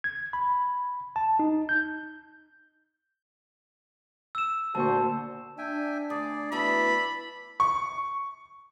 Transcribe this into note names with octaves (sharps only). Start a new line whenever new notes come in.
G#6
B5
A5
D#4
G6
E6 E7
D2 A#2 F#4 C5 A5 C#6
D4 E5 G5 G#5
D2 G#4 D5
B2 E3 A3 D5 E5 A5 B5
C#6